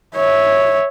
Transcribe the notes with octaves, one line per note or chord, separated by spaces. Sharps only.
C#5 E5